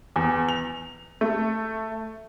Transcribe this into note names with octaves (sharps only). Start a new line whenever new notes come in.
E2
F7
A3